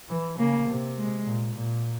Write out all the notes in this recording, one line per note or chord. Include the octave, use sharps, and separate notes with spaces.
E3
C#3 A#3
C3
G#3
A#2
A#2